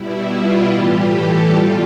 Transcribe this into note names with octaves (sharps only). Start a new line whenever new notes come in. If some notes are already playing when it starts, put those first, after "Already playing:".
Already playing: B2 G3 E4
F4
A2 E3 G3 G4
A4
B2 G3 F4